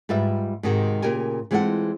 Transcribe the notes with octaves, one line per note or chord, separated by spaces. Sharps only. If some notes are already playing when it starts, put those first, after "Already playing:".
G#2 G3 F4 B4 E5
G#2 C3 D#3 G#3 F#4
A#2 C#3 G4 A#4 G#5
E3 G#3 C4 F4 A4 F#5